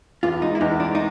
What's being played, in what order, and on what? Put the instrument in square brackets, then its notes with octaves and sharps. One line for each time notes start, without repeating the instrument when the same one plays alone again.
[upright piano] E2 [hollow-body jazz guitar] F4
[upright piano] G#3 [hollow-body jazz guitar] D#4
[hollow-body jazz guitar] E4
[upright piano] E2 [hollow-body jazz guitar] D#4
[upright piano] G#3 [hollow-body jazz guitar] D4
[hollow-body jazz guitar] D#4